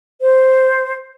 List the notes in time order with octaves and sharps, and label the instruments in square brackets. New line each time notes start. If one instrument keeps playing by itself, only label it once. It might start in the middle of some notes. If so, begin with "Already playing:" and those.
[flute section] C5